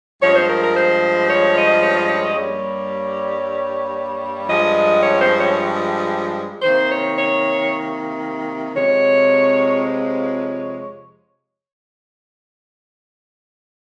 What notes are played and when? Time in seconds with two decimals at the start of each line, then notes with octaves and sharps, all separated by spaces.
0.22 G2 F3 G#3 C#5
0.36 C5
0.49 A#4
0.62 A#4
0.76 C5
1.29 C#5
1.56 D#5
1.82 C#5
1.95 D#5
2.09 C#5
2.22 D#5
2.35 G2 G3 A#3 C#5
4.49 G2 F3 G#3 D#5
5.02 C#5
5.20 C5
5.38 C#5
6.62 C3 D#3 A#3 C5
6.89 C#5
7.15 C#5
8.76 F2 C3 F3 G#3 C#5
9.82 C#5